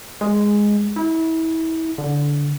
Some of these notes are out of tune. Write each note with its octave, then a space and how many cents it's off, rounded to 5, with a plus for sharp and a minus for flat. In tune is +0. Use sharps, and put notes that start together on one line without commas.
G#3 -5
E4 -30
D3 -15